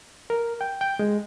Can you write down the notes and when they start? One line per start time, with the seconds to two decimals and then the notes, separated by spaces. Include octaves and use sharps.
0.30 A#4
0.61 G5
0.81 G5
0.99 G#3